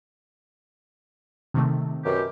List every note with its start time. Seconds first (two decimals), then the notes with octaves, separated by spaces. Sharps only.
1.54 C3 D#3 A3
2.05 F#2 B2 G4